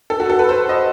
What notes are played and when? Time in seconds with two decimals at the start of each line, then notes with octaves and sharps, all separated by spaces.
0.10 A4
0.20 F#4
0.30 A4
0.39 B4
0.49 C5
0.69 D#5